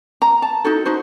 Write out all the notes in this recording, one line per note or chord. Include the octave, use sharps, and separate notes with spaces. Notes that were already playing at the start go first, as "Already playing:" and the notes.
A#5
A5
D#4 E4 F#4 A4
D#4 F#4 C5